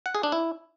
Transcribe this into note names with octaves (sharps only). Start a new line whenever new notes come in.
F#5
G#4
D4
E4